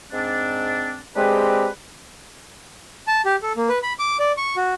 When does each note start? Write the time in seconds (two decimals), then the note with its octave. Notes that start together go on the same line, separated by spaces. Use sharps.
0.12 G#2 C4 D4
1.16 G#3 C4 D4 G4 G#4 B4
3.07 A5
3.25 G4
3.42 A4
3.56 A#3
3.69 B4
3.83 B5
3.99 D6
4.19 D5
4.37 C#6
4.56 F#4